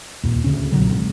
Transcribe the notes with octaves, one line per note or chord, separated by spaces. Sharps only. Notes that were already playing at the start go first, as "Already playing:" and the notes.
D#2 A#2
D2 C#3 C#4
B1 A#2 D3 F#3
G#1